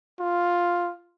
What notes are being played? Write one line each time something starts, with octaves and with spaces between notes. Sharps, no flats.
F4